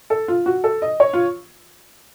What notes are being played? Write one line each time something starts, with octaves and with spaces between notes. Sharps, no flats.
A4
F4
F#4
A4
D#5
C#5
F4